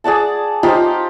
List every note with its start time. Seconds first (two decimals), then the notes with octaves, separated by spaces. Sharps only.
0.04 G#4 D5 F#5 A5
0.63 D#4 F4 G4 C5